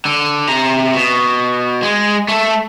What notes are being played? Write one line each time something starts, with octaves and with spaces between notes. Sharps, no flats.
D3
C3 A#5
B2
G#3
A3 A4